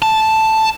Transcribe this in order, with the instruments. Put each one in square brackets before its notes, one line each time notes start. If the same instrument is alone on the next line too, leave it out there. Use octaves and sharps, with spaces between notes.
[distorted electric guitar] A5